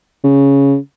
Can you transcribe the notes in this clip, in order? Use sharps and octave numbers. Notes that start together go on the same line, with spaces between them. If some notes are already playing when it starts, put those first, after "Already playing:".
C#3